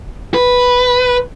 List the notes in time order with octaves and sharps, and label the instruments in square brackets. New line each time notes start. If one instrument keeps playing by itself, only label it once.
[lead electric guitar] B4